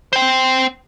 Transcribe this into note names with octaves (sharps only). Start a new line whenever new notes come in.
C5 G5